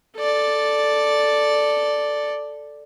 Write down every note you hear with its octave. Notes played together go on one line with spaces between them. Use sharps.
A4 D5